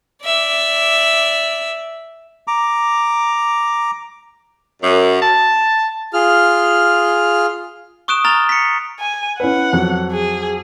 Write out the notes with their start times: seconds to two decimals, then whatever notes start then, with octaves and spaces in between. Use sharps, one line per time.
0.24 D5 E5
2.48 A#5 D6
4.82 F#2
5.22 A5
6.13 F4 G#4 F6
8.08 C#6 D#6 F#6 D7 E7
8.25 A#5 F6 A6 F7 G7
8.49 B6 C#7
9.00 G#5
9.40 C#4 E4 B4 F#5
9.73 F2 F#3
10.11 G#4